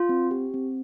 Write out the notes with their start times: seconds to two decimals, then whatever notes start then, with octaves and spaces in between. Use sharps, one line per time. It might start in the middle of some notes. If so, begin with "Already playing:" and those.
Already playing: F4
0.09 C4
0.31 G4
0.54 C4